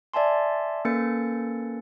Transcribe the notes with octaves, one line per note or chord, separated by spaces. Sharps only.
D5 E5 G#5 A5 C6
A#3 C#4 A4 B4 A6 C#7